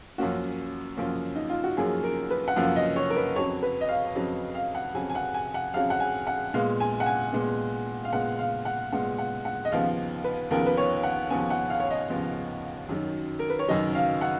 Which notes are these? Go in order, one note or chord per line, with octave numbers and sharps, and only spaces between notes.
F#2 F3 A#3 C#4 F#4
F#2 F3 A#3 C#4
D#4
F4
F#4
F#2 F3 A#3 C#4 G#4
A#4
B4
F#5
F#2 F3 A#3 C#4 F5
D#5
C#5
A#4
B4
F2 C#3 F#3 C#5
B4
D#5
F5
F2 C#3 F#3
F5
F#5
F2 C#3 F#3 G#5
G#5
F#5
G#5
F#5
F2 C#3 F#3 F5
F#5
G#5
F#5
A#2 G#3 B3 F5
G#5
F#5
G#5
A#2 G#3 B3
F5
A#2 G#3 B3 F#5
F5
F#5
A#2 G#3 B3 F#5
F#5
F#5
D#5
D#2 C#3 F3 B3 F5
B4
D#2 C#3 F3 B3 A#4
B4
C#5
F#5
D#2 C#3 F3 B3 G#5
F#5
F5
C#5
D#5
D#2 C#3 F3 B3
F#2 D#3 F#3
A#4
B4
C#5
F#2 D#3 F#3 D#5
F5
F#5